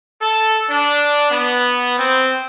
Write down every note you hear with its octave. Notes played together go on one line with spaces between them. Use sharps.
A4
D4
B3
C4